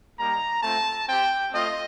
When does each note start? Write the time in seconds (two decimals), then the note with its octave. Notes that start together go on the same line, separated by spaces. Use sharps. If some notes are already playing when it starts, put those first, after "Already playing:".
0.18 G3 A#3 D#4 A#5
0.63 A3 C4 F4 A5
1.07 C4 G4 G5
1.52 A3 C4 F4 D#5